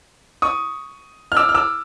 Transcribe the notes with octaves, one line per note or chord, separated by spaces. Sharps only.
C#6 D#6
F6
D6 E6
F6
D6 E6